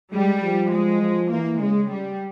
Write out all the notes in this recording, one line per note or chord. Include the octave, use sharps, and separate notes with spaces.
G3 G#3
F3
G#3
F3
E3 A#3
C#3 G#3
G3